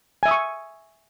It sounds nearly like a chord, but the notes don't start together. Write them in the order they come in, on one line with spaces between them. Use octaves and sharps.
G#5 E5 D#6 C#6